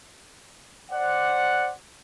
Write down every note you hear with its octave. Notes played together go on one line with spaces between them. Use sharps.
C5 D5 F#5